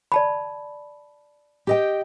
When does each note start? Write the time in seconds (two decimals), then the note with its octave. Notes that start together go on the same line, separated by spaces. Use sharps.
0.12 D5 A5 B5
1.67 G4 D#5 G5